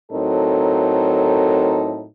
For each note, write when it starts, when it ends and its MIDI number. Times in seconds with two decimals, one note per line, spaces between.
0.11 2.04 45
0.11 2.04 54
0.11 2.04 60
0.11 2.04 63
0.11 2.04 69
0.11 2.04 70